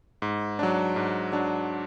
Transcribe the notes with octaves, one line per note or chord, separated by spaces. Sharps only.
G#2
F#3 D4
G#2
F#3 D4